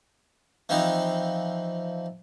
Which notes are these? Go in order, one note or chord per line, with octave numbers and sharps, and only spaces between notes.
E3 F3 C4 D#4